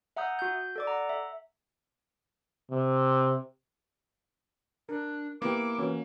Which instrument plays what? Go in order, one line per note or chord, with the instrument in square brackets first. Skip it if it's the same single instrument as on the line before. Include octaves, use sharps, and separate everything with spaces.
[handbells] E5 F#5 A#5 D#6 G6
F#4 G6
A4 D5 D6
F#5 A#5
E5
[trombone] C3
[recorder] D4 [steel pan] A#4
[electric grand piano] A#3 [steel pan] B3 G4 [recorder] E4 [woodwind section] D6
[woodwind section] E3 [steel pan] C#4 F#4